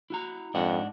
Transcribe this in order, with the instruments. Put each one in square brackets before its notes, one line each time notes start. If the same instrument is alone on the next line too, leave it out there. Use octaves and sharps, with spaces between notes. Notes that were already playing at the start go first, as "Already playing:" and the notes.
[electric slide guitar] E4 F#4 A#5
[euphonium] F2 [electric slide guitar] G#2 D4 F#5